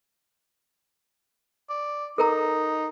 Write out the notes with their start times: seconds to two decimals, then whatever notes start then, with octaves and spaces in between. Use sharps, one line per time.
1.70 D5
2.18 D#4 A4 A#4 A#5